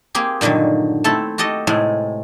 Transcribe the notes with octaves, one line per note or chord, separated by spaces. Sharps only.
A#3 C4 G4 G#4
G2 A#2 D3 D#3 F#3
A3 C4 E4 A4 A5
F#4 G4 A4 D#5
A2 C3 G#3 A3